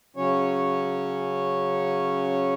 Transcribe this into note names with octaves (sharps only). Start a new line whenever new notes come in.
C#3 F#3 C#4 C#5